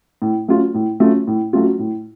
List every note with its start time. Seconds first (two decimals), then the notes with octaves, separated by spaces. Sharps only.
0.22 A2
0.48 F#3 A3 C#4 F4
0.74 A2
1.00 F#3 A3 C#4 F4
1.27 A2
1.53 F#3 A3 C#4 F4
1.79 A2